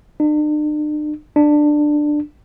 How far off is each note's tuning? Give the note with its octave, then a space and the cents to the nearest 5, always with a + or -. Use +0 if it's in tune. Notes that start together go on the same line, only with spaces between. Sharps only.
D4 +45
D4 +15